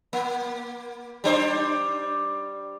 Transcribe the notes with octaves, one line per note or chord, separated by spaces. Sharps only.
A#3
G3 D4 C5